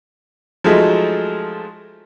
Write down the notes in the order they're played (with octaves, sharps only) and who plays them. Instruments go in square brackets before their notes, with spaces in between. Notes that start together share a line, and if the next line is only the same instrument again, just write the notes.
[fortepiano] F3 F#3 G#3 A3 D#4